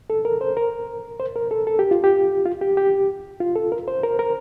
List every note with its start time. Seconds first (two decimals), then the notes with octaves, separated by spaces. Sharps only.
0.10 A4
0.25 A#4
0.41 C5
0.57 A#4
1.20 C5
1.36 A#4
1.51 A4
1.67 A4
1.79 G4
1.91 F4
2.04 G4
2.46 F4
2.61 G4
2.77 G4
3.40 F4
3.55 A4
3.72 A#4
3.88 C5
4.03 A#4
4.19 A#4